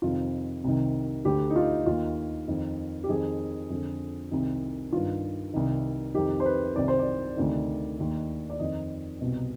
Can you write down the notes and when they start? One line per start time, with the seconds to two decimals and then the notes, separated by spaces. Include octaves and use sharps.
0.02 F2 C3 D#3 F4
0.64 C2 C3 D#3
1.25 D2 D3 G4
1.50 D#4
1.56 F4
1.86 D#2 D#3 F4
2.48 F2 D#3
3.04 G4
3.09 F2 D#3 G#4
3.70 F2 D3
4.31 C2 C3 D#3
4.92 G2 D#3 F4
5.54 C2 C3 D#3
6.14 F2 C3 D#3 G4
6.40 C5
6.46 B4
6.76 C2 C3 D#3 D5
6.88 C5
6.99 D5
7.37 D2 C3 D#3
7.99 D#2 D#3
8.50 D5
8.59 F2 D#3 D#5
9.21 C2 B2